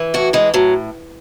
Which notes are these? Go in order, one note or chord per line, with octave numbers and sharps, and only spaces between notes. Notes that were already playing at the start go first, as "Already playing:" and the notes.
Already playing: E3
A2 F#4
E3 G#3
A2 F#3